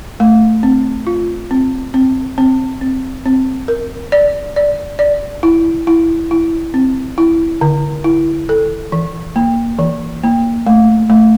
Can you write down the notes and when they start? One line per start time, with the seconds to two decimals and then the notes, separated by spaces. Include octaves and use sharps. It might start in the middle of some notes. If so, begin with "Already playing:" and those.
0.20 A3
0.63 C4
1.07 F4
1.51 C4
1.94 C4
2.38 C4
2.81 C4
3.26 C4
3.68 A#4
4.12 D5
4.56 D5
4.99 D5
5.43 E4
5.87 E4
6.31 E4
6.74 C4
7.18 E4
7.61 D3
8.04 E4
8.49 A4
8.92 E3
9.36 A#3
9.79 E3
10.24 A#3
10.67 A3
11.10 A3